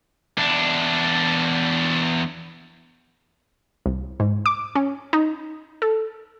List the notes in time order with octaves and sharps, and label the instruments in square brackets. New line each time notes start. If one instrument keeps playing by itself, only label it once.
[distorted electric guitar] E2 D4
[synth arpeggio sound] C2
G#2
D6
C#4
D#4
A4